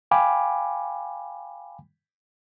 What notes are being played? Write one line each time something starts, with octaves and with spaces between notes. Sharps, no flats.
F5 G5 G#5 B5 D6